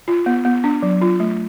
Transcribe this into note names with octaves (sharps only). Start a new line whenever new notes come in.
F4
B3
B3
D4
F#3
F4
A3